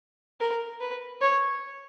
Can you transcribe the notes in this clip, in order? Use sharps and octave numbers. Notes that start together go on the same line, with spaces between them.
A#4
B4
C#5